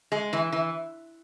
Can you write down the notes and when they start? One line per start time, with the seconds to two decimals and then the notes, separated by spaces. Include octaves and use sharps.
0.12 G#3
0.33 E3
0.52 E3